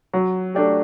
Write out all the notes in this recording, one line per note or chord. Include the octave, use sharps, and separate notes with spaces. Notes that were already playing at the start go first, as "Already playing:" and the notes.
F#3
A3 D4 G4